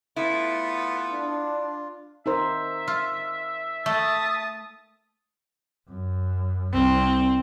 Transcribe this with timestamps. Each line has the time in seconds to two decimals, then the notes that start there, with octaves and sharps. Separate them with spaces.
0.16 A3 B3 E4 F4
1.12 D4
2.26 D#4 A#4 C5 E5
2.88 F4
3.86 A3 A5 D#6
5.88 F#2
6.73 C2 C4